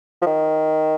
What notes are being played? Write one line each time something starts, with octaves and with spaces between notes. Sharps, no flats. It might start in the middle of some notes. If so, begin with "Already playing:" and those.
F3
D#3